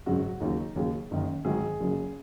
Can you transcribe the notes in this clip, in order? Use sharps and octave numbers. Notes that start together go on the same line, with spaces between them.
G#1 F#2 C#3 F#3 F#4
D#2 C#3 F#3 D#4
D#2 C#3 F#3
F#1 F#2 D#3
G#1 G#2 D#3 F#3 G#4
F#1 F#2 C#3 F#3